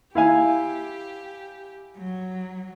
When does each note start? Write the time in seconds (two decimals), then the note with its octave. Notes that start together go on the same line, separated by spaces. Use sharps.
0.15 E4 G4 F5 G#5
1.97 F#3